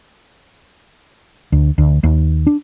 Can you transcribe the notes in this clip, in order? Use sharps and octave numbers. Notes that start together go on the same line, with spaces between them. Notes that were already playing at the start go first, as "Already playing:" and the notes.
D2
D2
D#2
D4